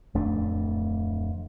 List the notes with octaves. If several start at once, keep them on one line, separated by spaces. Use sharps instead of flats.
D1 F2 A3 D4